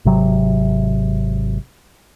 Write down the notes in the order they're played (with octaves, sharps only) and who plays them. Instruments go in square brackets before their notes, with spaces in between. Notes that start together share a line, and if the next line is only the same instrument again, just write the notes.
[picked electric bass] G#1 C3 F#3